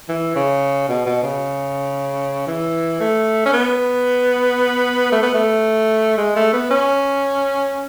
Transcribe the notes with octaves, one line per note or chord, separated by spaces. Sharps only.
E3
C#3
B2
B2
C#3
E3
A3
C#4
B3
A3
B3
A3
G#3
A3
B3
C#4